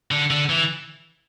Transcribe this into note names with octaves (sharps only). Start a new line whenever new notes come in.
D3
D3
E3